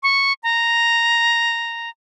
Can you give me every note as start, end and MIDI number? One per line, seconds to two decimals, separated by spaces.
0.03 0.33 85
0.43 1.90 82